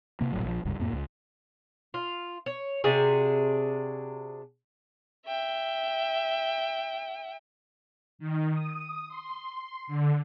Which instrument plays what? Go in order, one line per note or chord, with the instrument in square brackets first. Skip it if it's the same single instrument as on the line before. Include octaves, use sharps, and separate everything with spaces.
[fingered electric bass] C3 A#3
F1 A#1 A2 F#3
A#1 E3 F3
F1 C#2 G2
F2 A2 A#3
C#2
[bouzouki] F4
C#5
C3 D4 F#4 G#4
[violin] E5 G5
[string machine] D#3
D#6
C6
D3